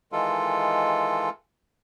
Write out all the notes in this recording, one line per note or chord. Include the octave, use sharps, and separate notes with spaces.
D#3 E3 G#3 F4 A4